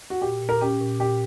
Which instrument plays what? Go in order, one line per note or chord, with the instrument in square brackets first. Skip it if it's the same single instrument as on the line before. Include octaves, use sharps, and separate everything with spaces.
[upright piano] F#4
[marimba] A#2 [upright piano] G4
[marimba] A#2
[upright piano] A#4
[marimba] C#4 [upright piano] G4
[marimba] A#2
[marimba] A#2 [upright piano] G4